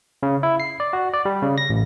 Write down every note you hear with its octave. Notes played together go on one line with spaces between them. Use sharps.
C#3
E4
C7
D5
F#4
D5
G3
C#3
A#6
A1